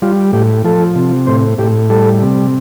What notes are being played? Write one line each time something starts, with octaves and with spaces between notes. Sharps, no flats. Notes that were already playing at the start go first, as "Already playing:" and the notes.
G3 F4
A2 G4
F3 A4
C3
A2 C5
A2 G4
G3 A4
C3